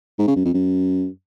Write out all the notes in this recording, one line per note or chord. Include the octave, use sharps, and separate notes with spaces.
G#2
C#3
F#2
F2
F#2